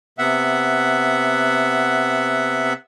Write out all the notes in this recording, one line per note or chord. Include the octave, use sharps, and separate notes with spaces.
C3 B3 E5 F#5